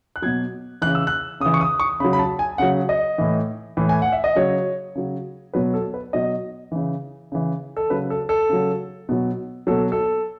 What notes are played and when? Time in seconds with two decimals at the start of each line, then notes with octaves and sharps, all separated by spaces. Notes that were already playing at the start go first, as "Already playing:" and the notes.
0.16 F#6
0.22 B2 F#3 G#6
0.82 C#3 E3 F#6
0.95 E6
1.07 F#6
1.40 C#3 D#6
1.46 E3
1.54 C#6
1.61 D#6
1.80 C#6
2.00 C#3 B5
2.05 F#3
2.13 B5
2.19 A5
2.39 G#5
2.58 C#3 F#3 F#5
2.89 D#5
3.18 A2 E3
3.77 A2 E3
3.89 G#5
4.02 F#5
4.12 E5
4.24 D#5
4.35 C#3 F#3 C#5
4.95 C#3 F#3
5.53 B2 F#3 B4
5.74 A4
5.94 B4
6.13 B2 F#3 D#5
6.72 C#3 E3
7.32 C#3 E3
7.77 A4
7.90 C#3 F#3 B4
8.10 A4
8.29 A4
8.49 C#3 F#3
9.09 B2 F#3
9.67 B2 F#3 A4
9.92 A4